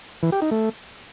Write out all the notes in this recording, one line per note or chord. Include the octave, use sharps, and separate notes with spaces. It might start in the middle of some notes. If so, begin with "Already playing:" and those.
E3
G4
D#4
A3